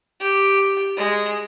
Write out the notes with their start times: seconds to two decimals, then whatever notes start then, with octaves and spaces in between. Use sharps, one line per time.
0.20 G4
0.97 G#3